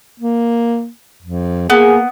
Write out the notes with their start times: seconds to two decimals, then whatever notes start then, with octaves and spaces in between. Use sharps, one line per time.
0.20 A#3
1.22 F2
1.70 A#3 B3 G#4